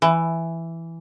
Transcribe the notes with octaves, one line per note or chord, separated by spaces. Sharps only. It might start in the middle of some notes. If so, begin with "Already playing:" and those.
E3